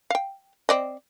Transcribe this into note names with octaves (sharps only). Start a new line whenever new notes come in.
F5 G5
C4 D5 D#5